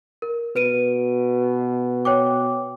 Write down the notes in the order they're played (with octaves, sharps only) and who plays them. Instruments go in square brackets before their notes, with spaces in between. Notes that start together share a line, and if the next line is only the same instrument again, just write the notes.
[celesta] A#4
[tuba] B2 [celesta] B4 D7 D#7
[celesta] C#5 G5 D6